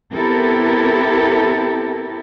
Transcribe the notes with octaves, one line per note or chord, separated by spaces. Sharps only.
B3 C4 E4 G4 A4 A#4